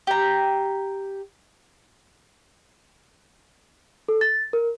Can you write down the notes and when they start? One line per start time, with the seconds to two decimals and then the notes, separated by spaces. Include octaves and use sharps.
0.07 G4 A#5
4.08 A4
4.21 A6
4.53 A#4